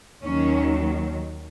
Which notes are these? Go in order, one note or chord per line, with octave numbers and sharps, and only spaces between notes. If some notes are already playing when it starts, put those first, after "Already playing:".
D#2 D#3 F#3 C#4